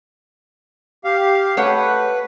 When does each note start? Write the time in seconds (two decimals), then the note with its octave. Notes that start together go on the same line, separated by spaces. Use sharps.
1.04 G4 F5
1.57 A3 B4 C#5 F#5